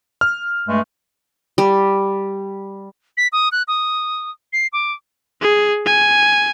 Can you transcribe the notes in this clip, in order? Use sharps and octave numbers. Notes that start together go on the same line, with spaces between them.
F6
G2 G#3 A3
G3
B6
D#6
F#6
D#6
C7
D6
G#4
G#5